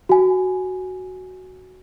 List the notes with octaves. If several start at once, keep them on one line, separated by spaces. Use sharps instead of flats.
F#4 G#5